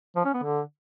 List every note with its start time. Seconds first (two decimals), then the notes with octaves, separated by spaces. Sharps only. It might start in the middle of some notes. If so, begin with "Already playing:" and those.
0.16 F3
0.25 C#4
0.34 B3
0.43 D3